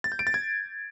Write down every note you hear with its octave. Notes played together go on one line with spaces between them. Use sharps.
A6
G6
D7
A6
G#6